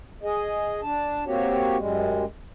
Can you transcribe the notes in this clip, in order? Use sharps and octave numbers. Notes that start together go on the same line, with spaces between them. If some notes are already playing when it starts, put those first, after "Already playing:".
G#4 D#5
D4 A5
A#3 C4 F#4 G4 C#5
F#2 G3 G#3